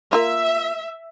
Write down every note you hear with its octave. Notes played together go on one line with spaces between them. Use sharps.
A#3 F4 E5